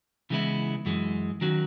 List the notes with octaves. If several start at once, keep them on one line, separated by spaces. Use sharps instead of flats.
C#3 E3 G#3 B3 E4
F#2 E3 G#3
D#3 F#3 C#4 F#4